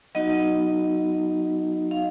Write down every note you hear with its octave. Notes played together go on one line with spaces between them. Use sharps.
F#3 B3 D#4 F#4 D#5
F5